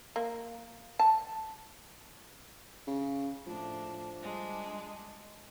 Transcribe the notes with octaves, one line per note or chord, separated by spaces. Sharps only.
A#3
A5
C#3
A2 F3 D4
G3 G#3 D4